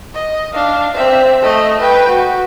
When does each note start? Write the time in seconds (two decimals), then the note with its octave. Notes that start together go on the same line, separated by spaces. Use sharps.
0.14 D#5
0.54 D4 F5
0.95 C4 E5
1.42 A3 D#5
1.80 B4 G5
2.09 F#4